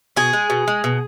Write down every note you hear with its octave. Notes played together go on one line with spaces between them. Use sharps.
B2 G#4
G#3
B2
G#3
B2